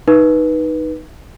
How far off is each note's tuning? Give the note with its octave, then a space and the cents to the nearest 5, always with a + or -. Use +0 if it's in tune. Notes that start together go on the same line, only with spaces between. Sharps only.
D#4 +0 B4 -15